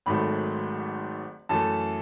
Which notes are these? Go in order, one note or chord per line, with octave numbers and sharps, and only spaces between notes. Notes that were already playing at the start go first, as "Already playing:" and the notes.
G#1 G#2 D#3 F#3 A3 B5
F#2 E3 A3 A5